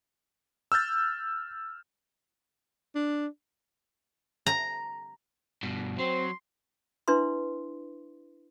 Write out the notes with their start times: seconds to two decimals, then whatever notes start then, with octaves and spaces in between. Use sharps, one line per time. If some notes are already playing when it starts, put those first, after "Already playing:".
0.72 E6 F6 G6 A6
2.95 D4
4.46 A#5
5.63 G2 B2
5.98 F#3 C4 C6
7.08 D4 E4 B4 E5 C6